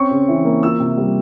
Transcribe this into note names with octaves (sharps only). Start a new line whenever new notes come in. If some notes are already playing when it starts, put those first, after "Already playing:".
Already playing: C4 C#4 C#6
C#3
E3
A#3
F4 E6
C3
G3